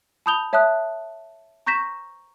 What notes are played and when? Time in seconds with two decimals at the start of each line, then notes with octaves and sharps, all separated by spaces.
0.26 A5 B5 D#6 G6 F7 G7
0.53 C#5 E5 A5 D#6 F#6
1.66 A#5 C#6 G6 A#6 B6 E7